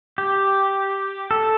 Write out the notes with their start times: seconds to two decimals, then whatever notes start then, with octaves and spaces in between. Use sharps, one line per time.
0.18 G4
1.31 A4